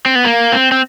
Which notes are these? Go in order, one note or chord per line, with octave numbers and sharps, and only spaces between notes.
C4
B3
A#3
C4
C4